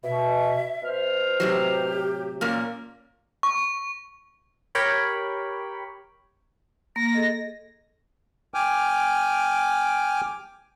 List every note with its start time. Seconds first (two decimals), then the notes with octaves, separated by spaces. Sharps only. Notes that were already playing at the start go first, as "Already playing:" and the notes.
0.04 B2 E5
0.83 B2 C5 F6
1.40 A2 C3 F#3 G4
2.41 A#2 A#3 C#4
3.43 C#6
4.75 G4 A#4 C#5 G5 B5
6.96 A#3 A#6
7.14 G#4 A4 D#5
8.54 G5 G#5 D6 F6